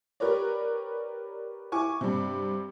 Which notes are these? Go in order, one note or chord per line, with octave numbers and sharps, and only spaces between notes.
G4 A#4 B4 C#5 D5
E4 G#5 C#6 D6
G2 C3